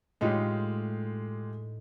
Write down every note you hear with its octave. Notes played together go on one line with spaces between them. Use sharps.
A2 G#3 A3 D#4 F4 G4